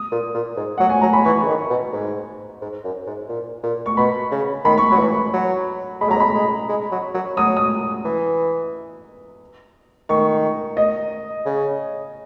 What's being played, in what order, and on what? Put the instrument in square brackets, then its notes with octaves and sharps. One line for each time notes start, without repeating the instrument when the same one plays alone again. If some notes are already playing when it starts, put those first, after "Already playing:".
Already playing: [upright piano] D#6
[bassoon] A#2
A#2
G#2
[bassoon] F#3 [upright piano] F#5
[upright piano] G#5
[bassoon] F#3 [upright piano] A#5
[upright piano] B5
[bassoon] E3 [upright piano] C#6
[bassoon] C#3
D#3
B2
G#2
G#2
F#2
G#2
A#2
A#2
[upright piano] C#6
[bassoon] B2 [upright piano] B5
[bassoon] C#3
[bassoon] D#3 [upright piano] B5
[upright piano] C#6
[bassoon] F#3 [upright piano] B5
[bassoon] E3
F#3
[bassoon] G#3 [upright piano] B5
[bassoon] F#3 [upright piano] A#5
[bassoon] G#3
[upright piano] B5
[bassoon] G#3
G#3
F#3
F#3
[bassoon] F#3 [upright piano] D#6
[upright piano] D#6
[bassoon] E3
[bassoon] D#3 [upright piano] C#6
[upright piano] D#5
[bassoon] C#3